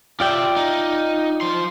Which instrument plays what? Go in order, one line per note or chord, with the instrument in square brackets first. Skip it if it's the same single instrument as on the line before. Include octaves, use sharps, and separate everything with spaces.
[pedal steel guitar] F4 D5 G5 [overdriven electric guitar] G4 E5
[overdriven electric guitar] D#4
F3 C6